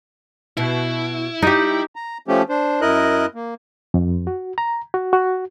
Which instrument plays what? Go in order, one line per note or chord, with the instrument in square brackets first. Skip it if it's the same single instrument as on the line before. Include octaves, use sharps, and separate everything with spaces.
[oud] B2 [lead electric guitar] E4
[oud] G3 [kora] D#4 G4
[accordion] A#5
F3 A3 C#4 G4
D4 C5
F#2 E4 A#4 D#5 F#6
A#3
[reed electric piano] F2
F#4
A#5
F#4
F#4